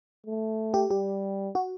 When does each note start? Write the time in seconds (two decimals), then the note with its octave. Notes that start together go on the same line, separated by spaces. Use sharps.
0.26 A3
0.74 G4
0.91 G3 G4
1.55 F#4